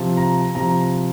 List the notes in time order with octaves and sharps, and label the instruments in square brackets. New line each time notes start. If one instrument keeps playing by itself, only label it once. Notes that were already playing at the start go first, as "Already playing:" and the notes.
Already playing: [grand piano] C3 F3
A#5
C3 F3 A#5